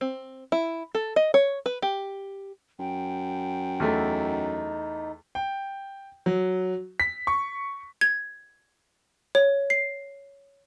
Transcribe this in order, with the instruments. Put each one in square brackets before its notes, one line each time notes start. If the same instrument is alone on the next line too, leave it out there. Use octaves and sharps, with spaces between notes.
[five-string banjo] C4
E4
A4
D#5
C#5
B4
G4
[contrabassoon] F#2 [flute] G5
[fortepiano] E2 A3 [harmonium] D#4
[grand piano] G5
F#3
B6
C#6
[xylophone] G#6
C#5
C7